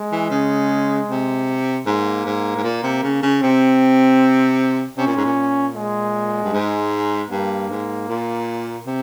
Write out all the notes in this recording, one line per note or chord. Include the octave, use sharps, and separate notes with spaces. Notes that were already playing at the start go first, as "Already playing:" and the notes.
Already playing: G#3
E3
C#3
C3
G#2 A#3
G#2
G#2
A#2
C3
C#3
C#3
C3 C4
C3 C#4
A#2
G#2
A#2
G#3
G2
G#2
G2 A#3
G#2
A#2
C3